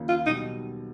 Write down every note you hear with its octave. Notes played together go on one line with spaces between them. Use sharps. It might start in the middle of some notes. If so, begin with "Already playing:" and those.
Already playing: D#2 C#3 F3 A#3
F4
B1 B2 G3 D#4